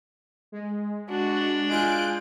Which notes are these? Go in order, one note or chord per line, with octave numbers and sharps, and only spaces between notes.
G#3
D4 F#4
G#3 F4 G#5 F#6 G6 D7